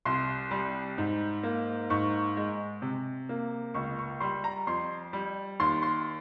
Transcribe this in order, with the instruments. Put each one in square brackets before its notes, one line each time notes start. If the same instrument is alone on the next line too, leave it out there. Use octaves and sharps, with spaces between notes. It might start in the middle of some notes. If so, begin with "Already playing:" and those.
[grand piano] C2 C6
G3
G#2
A#3
G#2 C#6
G#3
C3
A#3
C#2 C#6
C#6
G3 C6
A#5
F2 C6
G3
D#2 C6
C6